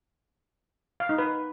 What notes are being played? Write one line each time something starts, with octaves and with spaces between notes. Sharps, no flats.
F5
D#4
B4